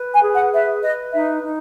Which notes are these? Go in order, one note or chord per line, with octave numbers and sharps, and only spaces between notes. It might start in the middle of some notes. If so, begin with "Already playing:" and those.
Already playing: B4
G#5
G#4
F#5
B4 E5
B4 D#5
D#4 E5
D#4